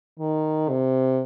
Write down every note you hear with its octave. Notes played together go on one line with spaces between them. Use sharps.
D#3
C3